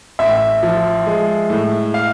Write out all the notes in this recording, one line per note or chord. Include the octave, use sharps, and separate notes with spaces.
A1 E5
F3
G#3
A2
F5